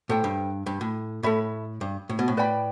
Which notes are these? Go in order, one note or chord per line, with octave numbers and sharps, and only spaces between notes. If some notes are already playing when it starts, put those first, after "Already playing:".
A2 A4 C5 G5
G2
G2
A2
A2 A4 E5 B5
G2
A2
B2
A2
B4 D5 G5 B5